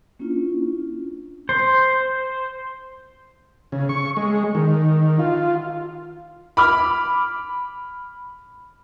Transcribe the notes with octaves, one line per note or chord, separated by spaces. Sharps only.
A#3 C#4 D4 E4 F4
C5
C#3
C#6
G#3
D#3
F4
B5 D6 F6